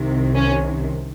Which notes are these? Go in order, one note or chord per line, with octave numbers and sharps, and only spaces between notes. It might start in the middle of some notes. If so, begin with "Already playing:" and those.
Already playing: C2 C3 D#3
C#4